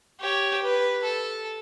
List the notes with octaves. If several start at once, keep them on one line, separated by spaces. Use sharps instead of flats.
G4 C#5
B4
A4